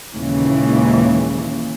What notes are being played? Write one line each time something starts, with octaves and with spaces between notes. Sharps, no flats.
D#2 A#2 C#3 E3 G#3